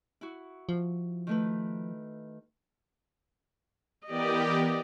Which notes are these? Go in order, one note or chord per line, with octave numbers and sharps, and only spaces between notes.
E4 F#4
F3
D#3 A3 B4
E3 B3 G4 A#4 D5 D#5